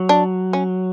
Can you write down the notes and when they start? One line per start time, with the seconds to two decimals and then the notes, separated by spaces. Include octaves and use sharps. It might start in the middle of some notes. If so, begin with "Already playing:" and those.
Already playing: F#3
0.09 D4
0.53 C#4